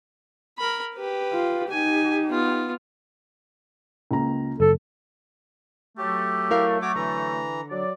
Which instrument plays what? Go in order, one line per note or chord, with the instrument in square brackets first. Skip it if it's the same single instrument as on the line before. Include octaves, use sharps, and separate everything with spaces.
[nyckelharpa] A#4 B5
G4 B4
[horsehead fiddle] F4
[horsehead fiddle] D#4 G4 [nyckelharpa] G#5
[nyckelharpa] B3 F4
[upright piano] C#2 A#3 A#5
[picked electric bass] F#1 [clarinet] A4
[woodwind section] F#3 A3 [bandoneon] G4
[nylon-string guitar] E4 A#4 F5
[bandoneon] F#4 C#5 D6
[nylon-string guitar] D3 [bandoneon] E3 A#5
[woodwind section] F#3 D5